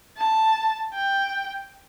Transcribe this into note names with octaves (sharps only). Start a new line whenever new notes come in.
A5
G5